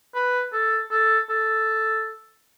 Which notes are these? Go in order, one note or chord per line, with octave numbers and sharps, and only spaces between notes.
B4
A4
A4
A4